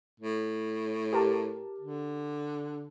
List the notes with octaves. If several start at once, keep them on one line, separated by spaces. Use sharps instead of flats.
A2
G4 A#4 A5
D3